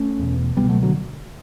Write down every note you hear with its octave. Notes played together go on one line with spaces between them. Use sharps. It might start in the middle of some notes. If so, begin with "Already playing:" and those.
Already playing: A3 C#4
E2 B2
C#2 B2 G3 B3
F#3 A3
D3 F#3